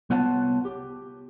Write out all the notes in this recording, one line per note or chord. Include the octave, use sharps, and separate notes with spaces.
C2 B3 F4 C#5 F#5 A5
G4